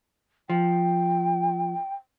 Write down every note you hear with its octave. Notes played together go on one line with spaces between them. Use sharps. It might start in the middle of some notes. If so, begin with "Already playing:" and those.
F3 G5